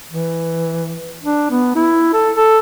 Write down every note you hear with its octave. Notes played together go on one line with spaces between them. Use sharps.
E3
D4
B3
E4
A4
A4